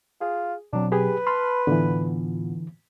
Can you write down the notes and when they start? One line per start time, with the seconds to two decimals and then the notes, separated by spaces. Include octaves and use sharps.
0.21 F4 G#4
0.73 B2 F#3 C4 D4
0.92 G4 G#4 B4
1.27 A5 B5 C6 F6
1.67 A2 D3 E3 B3 F4